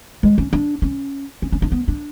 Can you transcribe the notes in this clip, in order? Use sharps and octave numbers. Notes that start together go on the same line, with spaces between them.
G#3
C#4
D4
C#4
C#4
C#4
D4
B3
D4